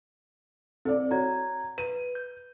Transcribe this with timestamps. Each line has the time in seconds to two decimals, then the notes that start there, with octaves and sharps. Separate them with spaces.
0.85 C4 A4 D5
1.11 F#4 C#5 A#5 G#6
1.78 B4 D#7
2.15 G6